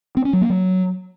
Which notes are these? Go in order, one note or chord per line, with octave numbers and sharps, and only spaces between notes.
C4
C#4
F#3
A#3
F#3